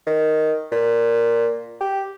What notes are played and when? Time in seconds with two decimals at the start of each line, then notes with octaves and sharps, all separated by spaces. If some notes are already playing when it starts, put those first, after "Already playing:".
0.07 D#3
0.72 A#2
1.81 G4